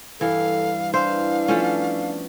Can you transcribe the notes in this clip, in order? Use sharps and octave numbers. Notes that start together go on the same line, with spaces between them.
G2 E3 A4 F5
E3 D4 C5 E5 F5
F3 A3 B3 C#4